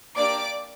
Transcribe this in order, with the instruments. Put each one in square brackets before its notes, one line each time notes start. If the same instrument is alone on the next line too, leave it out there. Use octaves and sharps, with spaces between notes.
[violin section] A#3 D4 G4 D5 D6